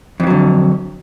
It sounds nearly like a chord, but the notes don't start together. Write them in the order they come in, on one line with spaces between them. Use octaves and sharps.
F2 E3 F#3 D3